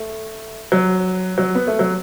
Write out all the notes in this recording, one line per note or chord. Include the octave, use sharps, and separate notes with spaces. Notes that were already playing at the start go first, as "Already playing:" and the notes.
Already playing: A3
F#3
F#3
B3
A3
F#3